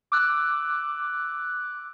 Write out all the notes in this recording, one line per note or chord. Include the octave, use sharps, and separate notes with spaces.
D6 E6 F#6